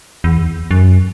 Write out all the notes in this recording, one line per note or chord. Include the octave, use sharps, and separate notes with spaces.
E2
F#2